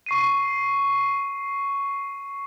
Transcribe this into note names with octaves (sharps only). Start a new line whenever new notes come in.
C#6 C7 D#7